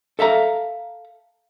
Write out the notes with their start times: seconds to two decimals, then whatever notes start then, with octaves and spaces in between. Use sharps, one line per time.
0.19 A4 E5 F5 A#5